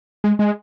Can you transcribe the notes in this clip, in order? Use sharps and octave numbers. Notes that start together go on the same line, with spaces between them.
G#3
G#3